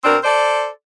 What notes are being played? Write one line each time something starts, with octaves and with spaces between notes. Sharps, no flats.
B2 C4 D4 A#4
A4 C5 D5